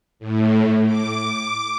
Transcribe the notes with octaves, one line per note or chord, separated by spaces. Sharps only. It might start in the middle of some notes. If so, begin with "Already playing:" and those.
A2
D6